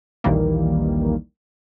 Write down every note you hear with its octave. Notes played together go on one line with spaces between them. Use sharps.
A#1 D#2 D#3 E3 G3 A#3